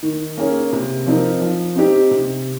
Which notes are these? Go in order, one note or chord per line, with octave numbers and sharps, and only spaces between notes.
D#3
A#3 C#4 G#4
C3
F3 C4 D#4 A#4
F3
C4 D#4 G4
C3